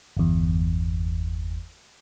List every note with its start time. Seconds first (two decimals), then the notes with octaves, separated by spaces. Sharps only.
0.17 G1 E2